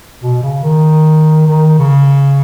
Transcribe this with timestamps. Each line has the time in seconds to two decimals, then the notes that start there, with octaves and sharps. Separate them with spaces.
0.22 B2
0.43 C#3
0.63 D#3
1.47 D#3
1.79 C#3